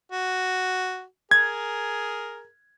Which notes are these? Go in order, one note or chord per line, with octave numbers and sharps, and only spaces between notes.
F#4
G#4 A#4 G#6